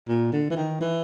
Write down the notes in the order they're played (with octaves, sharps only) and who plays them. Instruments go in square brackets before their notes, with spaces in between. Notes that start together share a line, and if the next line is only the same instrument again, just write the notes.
[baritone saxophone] A#2
D3
E3
D#3
E3